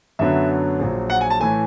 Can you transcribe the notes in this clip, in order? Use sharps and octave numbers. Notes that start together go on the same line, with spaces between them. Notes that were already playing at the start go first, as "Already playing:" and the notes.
F#2 D3 F#3 B3 E5
A#1 A#2 F#3
F#5
G#5
A5
A2 E3 A3 G#5